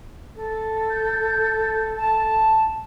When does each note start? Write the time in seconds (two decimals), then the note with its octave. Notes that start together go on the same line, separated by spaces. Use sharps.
0.36 A4
0.90 G6
1.97 A5